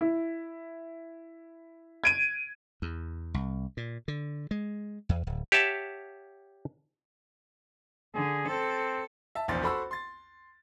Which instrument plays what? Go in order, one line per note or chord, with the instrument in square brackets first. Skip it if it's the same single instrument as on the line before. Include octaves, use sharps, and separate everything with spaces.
[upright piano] E4
G#6 D7 D#7
[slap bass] E2
C2
A#2
D3
G#3
E2
D1
[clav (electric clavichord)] G4 C#5 E5 F#5 A5
[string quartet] D3 [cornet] G#4
[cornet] C4 [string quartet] A4
[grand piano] E5 A5
F1 A#1 E2 C5 A6
F#4 A4 C5 B5 C#6 E6
C6 A6